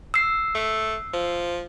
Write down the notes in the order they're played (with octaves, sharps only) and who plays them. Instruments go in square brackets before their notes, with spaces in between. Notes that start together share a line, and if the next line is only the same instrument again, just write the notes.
[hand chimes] E6 C7
[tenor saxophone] A3
F3